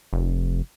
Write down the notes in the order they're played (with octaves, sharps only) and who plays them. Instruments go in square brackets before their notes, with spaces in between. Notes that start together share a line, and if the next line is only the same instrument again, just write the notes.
[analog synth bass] F1